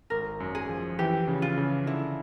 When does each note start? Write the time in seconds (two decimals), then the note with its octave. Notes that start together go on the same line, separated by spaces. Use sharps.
0.10 G#1 A#4
0.40 F#2
0.55 G#4
0.69 F3
0.99 E3 G4
1.28 C#3
1.42 F4
1.57 C#3
1.87 D3 E4